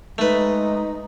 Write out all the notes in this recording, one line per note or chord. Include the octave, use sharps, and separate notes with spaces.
G#3 A3 D#4 B4